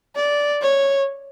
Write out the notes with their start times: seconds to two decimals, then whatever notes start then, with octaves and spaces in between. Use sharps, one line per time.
0.16 D5
0.62 C#5